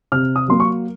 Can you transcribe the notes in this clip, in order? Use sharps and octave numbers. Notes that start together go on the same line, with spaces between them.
C3 F6
D#6
F#3 A#3 C6
C#6